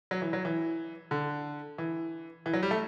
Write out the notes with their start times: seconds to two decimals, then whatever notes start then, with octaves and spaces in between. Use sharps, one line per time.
0.11 F#3
0.22 E3
0.33 F#3
0.45 E3
1.11 D3
1.78 E3
2.46 E3
2.53 F#3
2.63 G3
2.71 A3